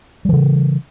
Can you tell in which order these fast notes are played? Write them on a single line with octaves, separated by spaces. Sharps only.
G3 E3 C#3